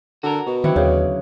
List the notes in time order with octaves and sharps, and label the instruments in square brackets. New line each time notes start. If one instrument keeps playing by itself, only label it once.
[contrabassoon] D3 [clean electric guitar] F#4 A#4
[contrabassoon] B2
[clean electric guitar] D3 F#3 [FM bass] D#3 [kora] C4 E4 F#5
[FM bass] D#2 [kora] C#3